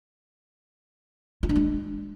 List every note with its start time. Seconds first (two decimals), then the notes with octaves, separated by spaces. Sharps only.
1.43 F4
1.49 D4
1.56 G#3